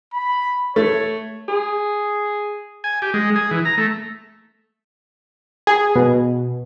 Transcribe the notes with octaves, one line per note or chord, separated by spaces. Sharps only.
B5
A3 C#5
G#4
G#5
G4
G#3
G#4
E3
A#5
A3
G#4
B2